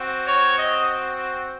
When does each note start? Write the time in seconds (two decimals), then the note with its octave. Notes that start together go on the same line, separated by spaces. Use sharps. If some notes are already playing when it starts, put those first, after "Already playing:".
Already playing: C4 F#4
0.24 C#5
0.56 D#5